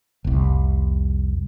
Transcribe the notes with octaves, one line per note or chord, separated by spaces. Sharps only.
F1 C2